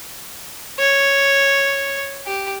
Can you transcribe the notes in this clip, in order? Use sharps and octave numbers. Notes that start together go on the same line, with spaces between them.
C#5
G4